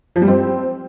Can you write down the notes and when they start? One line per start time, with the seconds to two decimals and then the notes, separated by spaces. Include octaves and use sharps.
0.16 F3
0.22 G3
0.28 C4